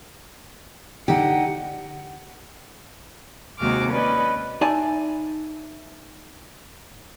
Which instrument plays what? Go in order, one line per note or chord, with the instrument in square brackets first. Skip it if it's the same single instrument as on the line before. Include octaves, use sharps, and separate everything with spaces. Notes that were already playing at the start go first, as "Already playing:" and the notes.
[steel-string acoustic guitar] D3 D#4 [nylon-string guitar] G4 [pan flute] F#5
[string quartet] D#2 C3 G#3 F#4 D6 F6
C#4 B4 D5 D#5
[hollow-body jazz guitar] D#4 D5 E5 G#5 A5